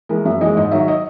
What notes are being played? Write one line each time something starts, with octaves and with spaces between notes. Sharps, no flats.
E3 G#3 A#4
F#2 E5
E3 G#3 D#5
G#2 D#5
D#3 F#3 E5
D#5